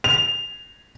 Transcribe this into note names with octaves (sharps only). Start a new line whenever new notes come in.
F7